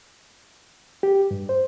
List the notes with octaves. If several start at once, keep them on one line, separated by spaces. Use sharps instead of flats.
G4
G2
C5